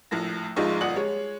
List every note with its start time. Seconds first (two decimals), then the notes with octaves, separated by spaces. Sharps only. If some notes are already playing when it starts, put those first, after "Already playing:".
0.11 A#1 A2 A#6
0.56 A#1 G#2 G#3 D#4 F4 C#6
0.81 G1 A#2 D5 D#5 F#5 F#7
0.96 G#3 C#5